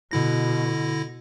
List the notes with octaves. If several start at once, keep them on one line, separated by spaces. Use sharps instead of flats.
B2 D3 E4 A#6